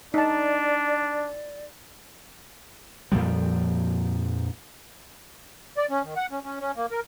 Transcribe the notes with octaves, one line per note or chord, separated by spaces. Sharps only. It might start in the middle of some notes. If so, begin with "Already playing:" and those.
D4 D#4 D5 A5
F2 A#2 F3 G3
D5
C#4
D#3
F#5
C#4
C#4
C#4
A#3
A#4